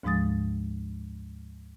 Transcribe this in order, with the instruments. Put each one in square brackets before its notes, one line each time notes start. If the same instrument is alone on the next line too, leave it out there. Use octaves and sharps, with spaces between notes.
[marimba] D2 G#2 F3 G#3 D#6 A6